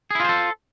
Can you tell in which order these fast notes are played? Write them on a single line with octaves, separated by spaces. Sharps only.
G#4 E4 F4 C5 A4